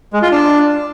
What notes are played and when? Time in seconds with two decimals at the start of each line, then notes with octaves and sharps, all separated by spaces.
0.13 G#3
0.22 F4
0.31 D4